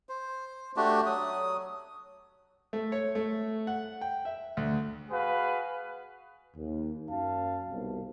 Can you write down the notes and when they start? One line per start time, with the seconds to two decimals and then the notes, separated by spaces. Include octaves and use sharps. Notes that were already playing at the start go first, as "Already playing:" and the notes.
0.09 C5
0.76 A3 D4 F#4 G4
1.06 F#3 D#6
2.73 A3
2.92 C#5
3.15 A3
3.67 F#5
4.01 G5
4.25 E5
4.57 D2
5.10 F#4 G#4 B4 F5
6.57 D#2
7.09 F#2 F5 A5
7.70 C2 B2 D#3